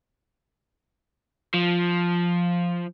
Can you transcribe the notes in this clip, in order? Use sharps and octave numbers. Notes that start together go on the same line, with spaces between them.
F3